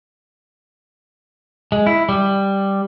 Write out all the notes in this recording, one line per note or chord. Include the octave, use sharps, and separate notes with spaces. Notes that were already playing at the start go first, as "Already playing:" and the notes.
G#3
E4
G3